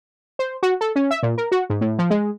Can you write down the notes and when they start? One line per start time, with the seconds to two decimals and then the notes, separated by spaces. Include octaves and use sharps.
0.39 C5
0.63 F#4
0.81 A4
0.96 C#4
1.11 E5
1.23 A#2
1.38 A#4
1.52 F#4
1.70 G#2
1.81 A2
1.99 F3
2.10 G#3